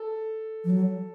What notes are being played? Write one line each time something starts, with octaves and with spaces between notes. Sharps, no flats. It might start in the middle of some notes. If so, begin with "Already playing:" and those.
Already playing: A4
F3
F#3